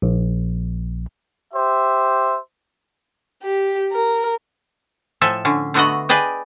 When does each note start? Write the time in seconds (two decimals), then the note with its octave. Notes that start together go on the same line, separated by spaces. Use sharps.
0.02 A#1
1.53 G4 C5 E5
3.43 G4
3.92 A#4
5.21 A2 F3 A4 E5 G#5
5.45 D3 C#4
5.74 D3 A3 B3 F#4 D#5 F#5
6.09 G#4 B4 D5 D#5 G5